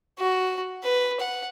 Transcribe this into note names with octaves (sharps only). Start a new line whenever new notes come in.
F#4
B4
F#5